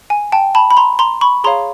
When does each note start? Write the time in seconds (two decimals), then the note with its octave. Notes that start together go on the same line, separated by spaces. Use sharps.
0.10 G#5
0.32 G5 A5
0.55 A5 B5
0.71 B5
0.77 A#5 C6
0.99 A#5 C6
1.21 B5 C#6
1.44 G#4 C#5 F5 A#5 C6